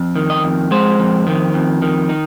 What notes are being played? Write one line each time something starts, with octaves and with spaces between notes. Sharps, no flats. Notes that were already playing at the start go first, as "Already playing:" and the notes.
Already playing: F2
D#3
D#5
F2
G#3 C5
F2
D#3
F2
D#3
D#4